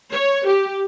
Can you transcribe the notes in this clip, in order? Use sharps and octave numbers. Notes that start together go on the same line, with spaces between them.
C#5
G4